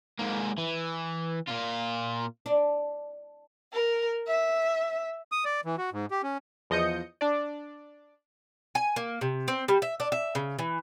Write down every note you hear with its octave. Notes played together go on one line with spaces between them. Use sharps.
G#2 A#3
E3
A#2 F4
D4
A#4
E5
D#6
D5
E3
F#4
G#2
G4
C#4
E2 F3 D#5 D#6 G6 C#7
D4 D5
G#5
A#3
C3
C4
G3
E5
D4
E5
C#3
E3